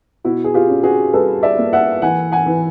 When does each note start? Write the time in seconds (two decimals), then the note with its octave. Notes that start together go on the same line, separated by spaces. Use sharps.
0.24 B2 E4 F#4
0.44 G#4
0.54 F4 G4
0.69 C#4
0.83 F#4 G#4
1.13 G3 A4 B4
1.43 D5 E5
1.58 A#3
1.73 E5 F#5
2.02 E3 F#5 G#5
2.32 F#5 G#5
2.46 E3